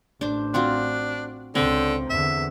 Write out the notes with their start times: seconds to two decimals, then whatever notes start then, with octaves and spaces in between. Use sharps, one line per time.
0.21 A1 D4 C5
0.54 C4 D4 F4 F#4
1.55 C#2 D3 C4
2.10 E2 D3 E5